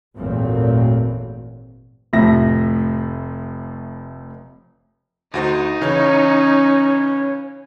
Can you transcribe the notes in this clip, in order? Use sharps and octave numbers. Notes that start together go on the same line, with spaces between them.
G#1 E2 A#2 F#3 A3 C4
F1 A2 F3 E5 A#6
D2 D#4 F#4 C5
C#3 E3 C#4 C#5